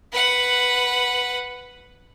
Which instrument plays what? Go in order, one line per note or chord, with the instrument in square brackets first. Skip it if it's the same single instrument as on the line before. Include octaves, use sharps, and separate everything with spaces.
[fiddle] B4 F#5